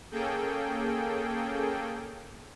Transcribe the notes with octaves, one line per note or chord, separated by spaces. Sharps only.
A#3 C#4 G#4 A4 G5